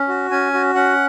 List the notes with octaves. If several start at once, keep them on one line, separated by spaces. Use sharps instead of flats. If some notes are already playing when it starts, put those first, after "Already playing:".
Already playing: C#4
F#4
C#4 G#5
F#4
C#4 F#5